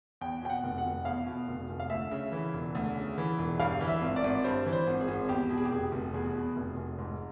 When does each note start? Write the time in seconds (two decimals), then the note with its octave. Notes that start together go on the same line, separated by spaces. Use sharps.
0.21 E2 G5
0.42 B2 G5
0.49 F#5
0.63 F1
0.78 F#5
0.85 F1
1.05 E2 F5
1.27 B2
1.48 F1
1.69 F1
1.80 F5
1.90 D2 E5
2.11 C#3
2.32 E3
2.53 E1
2.75 D2
2.96 C#3
3.18 E3
3.39 E1
3.59 G2 F5
3.81 E3
3.88 E5
4.02 G#1
4.16 D5
4.24 G#1
4.44 G2 C5
4.66 E3
4.73 C5
4.87 G#1
5.01 G#4
5.08 G#1
5.28 E2 G4
5.50 B2
5.57 G#4
5.65 G4
5.71 F1 G#4
5.92 F1
6.14 E2 G#4
6.35 B2
6.56 F1
6.77 F1
6.98 G#2